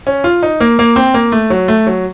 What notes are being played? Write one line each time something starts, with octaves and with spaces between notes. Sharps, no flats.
C#4
F4
D#4
A#3
A#3
C4
A#3
A3
F#3
A3
F#3